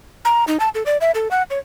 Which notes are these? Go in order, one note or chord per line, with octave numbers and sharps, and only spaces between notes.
A#5
D#4
A5
A4
D5
E5
A4
F#5
C#5